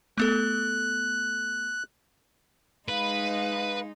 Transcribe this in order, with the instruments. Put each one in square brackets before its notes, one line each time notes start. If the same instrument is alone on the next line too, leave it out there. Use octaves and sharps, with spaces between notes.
[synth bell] A3 B3 A4 [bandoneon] F#6
[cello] G#3 D#4 [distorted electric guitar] B4 [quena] F5